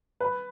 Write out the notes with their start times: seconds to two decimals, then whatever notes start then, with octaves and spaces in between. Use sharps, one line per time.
0.20 B4